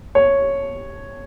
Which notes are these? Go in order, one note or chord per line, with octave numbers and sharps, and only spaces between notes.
C#5